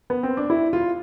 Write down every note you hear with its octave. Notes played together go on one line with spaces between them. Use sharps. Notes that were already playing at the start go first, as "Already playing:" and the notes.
B3
C4
D4
E4
F4